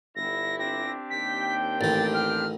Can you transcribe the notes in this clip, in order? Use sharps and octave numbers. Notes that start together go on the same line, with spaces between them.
G1 E4 A#6
C4 D4 G4 A#6
D#2 G5 B6
A1 D#3 A6
F6